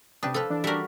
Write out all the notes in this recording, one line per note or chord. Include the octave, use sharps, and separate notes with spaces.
C3 D4 B4 G5 D#6
F3 A4 B4
E3 D4
G3 F#4 A#4 E5